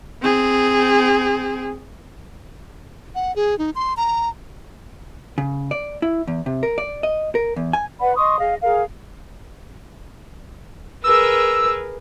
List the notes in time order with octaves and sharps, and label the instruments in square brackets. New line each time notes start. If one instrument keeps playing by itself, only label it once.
[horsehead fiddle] C4 G#4
[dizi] F#5
G#4
D#4
C6
A#5
[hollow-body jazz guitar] C#3
D5
E4
E2
C3
A#4
D5
D#5
A#4
E2
G#5
[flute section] B4 D5 F#5 B5
D#5 C6 C#6 D#6
G#4 D#5 F5
G#4 A#4 F5
[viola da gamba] G#4 A#4 B4 [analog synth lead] E6